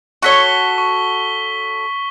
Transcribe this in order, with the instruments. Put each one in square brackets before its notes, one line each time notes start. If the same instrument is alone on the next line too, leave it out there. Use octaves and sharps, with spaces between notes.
[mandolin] F#4 A4 C#5 [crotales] C#6 B6 G7
[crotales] C#6